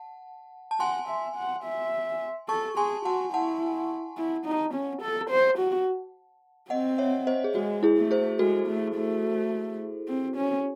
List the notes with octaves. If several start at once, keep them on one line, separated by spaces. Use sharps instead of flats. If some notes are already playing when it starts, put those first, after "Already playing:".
Already playing: F#5 A5
A5
F#5 G#5 C6
E5
F#5
E5
A4 A5 C#6
G#4 G#5 C6
F#4 F#5 A5
E4 F#5 A5
E4
D#4
C#4
A4
C5
F#4
C4 D#5 F#5
C#5 E5
C5 D#5
G#4
G#3 F#4
E4 G#4
A3
G#4 C5
G#3 F#4 A4
A3
A3
C4
C#4